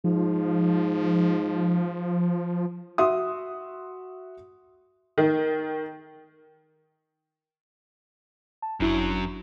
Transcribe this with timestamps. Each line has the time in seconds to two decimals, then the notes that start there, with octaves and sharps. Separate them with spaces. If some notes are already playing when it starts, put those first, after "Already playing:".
0.04 G#2 F3
2.98 F#4 E5 C6 D#6
5.18 D#3
8.62 A5
8.80 G1 F#2 F#3 D4 E4